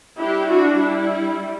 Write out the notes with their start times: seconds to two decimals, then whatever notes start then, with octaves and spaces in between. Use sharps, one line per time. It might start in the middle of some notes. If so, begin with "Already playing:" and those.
0.18 G3 D4 E4 G4
0.49 D4 F#4
0.80 E4